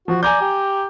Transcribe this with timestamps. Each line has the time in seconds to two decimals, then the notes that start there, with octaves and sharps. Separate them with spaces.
0.08 F3 F#4
0.23 D5 G#5 A#5 G6
0.41 G4